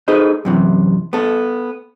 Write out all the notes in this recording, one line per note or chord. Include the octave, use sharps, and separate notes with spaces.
D#4 G#4 A4 B4 C5 D#5
F#2 C3 E3
B3 A4